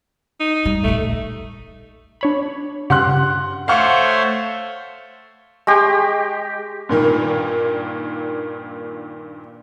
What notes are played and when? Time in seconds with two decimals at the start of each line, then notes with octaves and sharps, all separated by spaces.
0.40 D#4
0.65 G3
0.84 A#1 D#2 A3
2.21 D4 C#5 B5
2.90 G2 C#3 G4 F#5 C6 F#6
3.68 A3 C5 C#5 F5 F#5 C#6
5.67 G#3 G4
6.89 G2 A#2 D#3 A#3